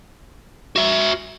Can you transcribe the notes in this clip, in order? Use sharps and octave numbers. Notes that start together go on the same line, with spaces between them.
F#4 E5